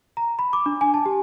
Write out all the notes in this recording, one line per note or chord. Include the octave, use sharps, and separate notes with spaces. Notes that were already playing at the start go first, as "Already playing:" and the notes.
A#5
B5
D6
D4
G#5
A5
G4